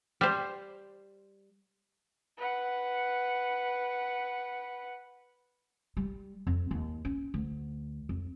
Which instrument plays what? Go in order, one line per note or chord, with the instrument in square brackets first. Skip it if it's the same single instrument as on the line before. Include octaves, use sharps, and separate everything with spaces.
[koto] G3 C5
[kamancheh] B4 F#5
[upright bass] G3
F2
D#2
C#4
D2
F2